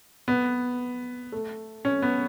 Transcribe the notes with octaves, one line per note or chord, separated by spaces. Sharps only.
B3
A3
C#4
B3